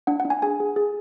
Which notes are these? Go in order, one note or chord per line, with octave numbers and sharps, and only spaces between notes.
D4 F#5
F#5
D4
G#5
G#4 G#5
G#4
G#4